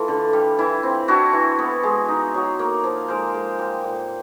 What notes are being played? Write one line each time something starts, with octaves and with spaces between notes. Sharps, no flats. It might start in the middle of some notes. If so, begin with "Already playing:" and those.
Already playing: E3 A3 F4
D3
G3
E3 E4
C4
D4 E4 F#4
E3
B3
G#3
D#4
F#3
A#3
F3
G#3 A#4 C5
G#3
G3
A#2